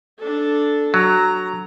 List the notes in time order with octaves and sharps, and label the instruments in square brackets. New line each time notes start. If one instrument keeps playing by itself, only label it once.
[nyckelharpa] D4 A4
[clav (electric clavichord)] F#3 [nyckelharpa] A#5